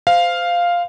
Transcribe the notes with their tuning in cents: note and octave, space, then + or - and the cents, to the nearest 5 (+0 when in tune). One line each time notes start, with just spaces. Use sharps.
C5 -25 F5 +0